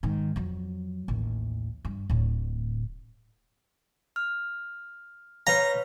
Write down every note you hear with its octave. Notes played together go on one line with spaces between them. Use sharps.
G#2 D#3
F2 F#3
A1 D#2
G2
D1 A2
F6
B4 C#5 F5 A#5